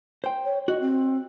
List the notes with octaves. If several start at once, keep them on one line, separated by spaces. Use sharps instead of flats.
C5 G5
C#5
F#4 D#5
C4